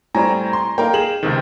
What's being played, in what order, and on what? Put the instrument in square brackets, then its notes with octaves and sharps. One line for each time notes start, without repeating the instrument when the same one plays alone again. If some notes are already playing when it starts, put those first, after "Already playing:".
[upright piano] A2 G3 C4 [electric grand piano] G#5 A#5
[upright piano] C6
[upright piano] A#3 D#4 A#4 [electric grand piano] F5 G5
[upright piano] G#4 E7 F#7
[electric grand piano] C#2 C3 D#3